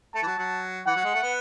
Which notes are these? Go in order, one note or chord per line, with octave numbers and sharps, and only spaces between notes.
A3 A5
E3
F#3
F#3
E3 F#5
F#3
G#3
A3
B3